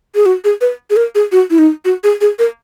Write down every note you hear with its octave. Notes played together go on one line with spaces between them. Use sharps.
G#4
F#4
G#4
B4
G#4
A#4
G#4
F#4
E4
D#4
F#4
G#4
G#4
A#4